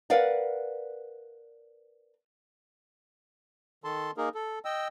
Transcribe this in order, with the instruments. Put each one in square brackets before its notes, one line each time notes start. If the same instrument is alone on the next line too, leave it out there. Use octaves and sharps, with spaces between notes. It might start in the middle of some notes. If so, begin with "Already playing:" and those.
[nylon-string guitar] A#4 B4 D5 F5 F#5
[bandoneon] D#3 A4 A5 C6
A#3 D#4 G#4 A#4
A4
D#5 G5 E6